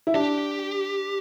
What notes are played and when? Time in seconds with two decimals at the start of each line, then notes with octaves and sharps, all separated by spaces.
0.07 E4
0.14 D4 G4